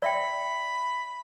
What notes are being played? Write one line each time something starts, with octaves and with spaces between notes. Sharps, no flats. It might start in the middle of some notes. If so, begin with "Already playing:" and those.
D5 E5 G5 B5